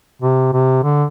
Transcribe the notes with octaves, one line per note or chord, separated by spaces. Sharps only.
C3
C3
D3